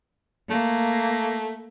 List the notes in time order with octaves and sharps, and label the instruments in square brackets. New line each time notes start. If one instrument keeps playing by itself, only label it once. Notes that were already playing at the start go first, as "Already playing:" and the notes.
[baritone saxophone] A3 [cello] A#3